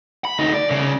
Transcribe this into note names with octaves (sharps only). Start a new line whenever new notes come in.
B5
D2 D#4
D5
C2 C#3